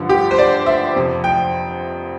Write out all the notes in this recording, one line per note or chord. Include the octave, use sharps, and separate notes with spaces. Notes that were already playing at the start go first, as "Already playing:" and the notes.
Already playing: G2 D3 F3
G4
C5
D5
E5
F2 C3 F3
G5